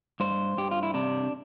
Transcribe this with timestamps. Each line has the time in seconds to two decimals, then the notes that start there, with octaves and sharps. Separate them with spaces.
0.20 G2 C5
0.58 G2 G4
0.71 F4
0.83 E4
0.94 C3 D4